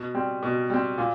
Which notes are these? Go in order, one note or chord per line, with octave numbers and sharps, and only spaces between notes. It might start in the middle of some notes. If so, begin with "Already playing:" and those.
Already playing: B2
G3 C4
B2
G3 C4
A#2